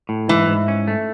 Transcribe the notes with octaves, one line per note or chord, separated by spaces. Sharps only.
A2
G#2 E3
G#2
C#4
A3